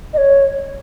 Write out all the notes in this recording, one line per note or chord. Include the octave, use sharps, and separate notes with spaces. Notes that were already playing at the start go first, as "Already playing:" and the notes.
D#5
C#5